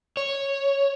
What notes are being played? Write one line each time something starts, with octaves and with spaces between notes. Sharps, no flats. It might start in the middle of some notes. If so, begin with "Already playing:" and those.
C#5